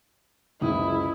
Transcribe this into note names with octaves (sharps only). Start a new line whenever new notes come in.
F#1 C#2 E4 D#6